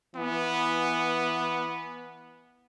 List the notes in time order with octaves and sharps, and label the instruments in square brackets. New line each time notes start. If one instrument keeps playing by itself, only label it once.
[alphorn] E3 [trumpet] B3